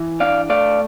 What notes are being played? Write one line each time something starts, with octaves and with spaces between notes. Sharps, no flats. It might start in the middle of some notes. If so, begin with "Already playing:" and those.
Already playing: E3
D4 D5 F5
A3 D5 F5